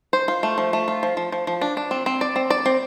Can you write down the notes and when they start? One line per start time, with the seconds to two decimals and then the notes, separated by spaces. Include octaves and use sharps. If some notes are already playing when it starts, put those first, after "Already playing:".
0.13 C5
0.28 F4
0.43 A3
0.58 F3
0.73 A3
0.88 F4
1.03 F3
1.17 F3
1.32 F3
1.47 F3
1.62 D4
1.77 D4
1.91 C4
2.06 C4
2.21 D5
2.36 C4
2.50 D5
2.66 C4